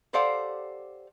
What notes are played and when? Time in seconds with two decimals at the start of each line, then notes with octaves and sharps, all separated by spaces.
0.13 G4 A4 C5 D5 F5 F#5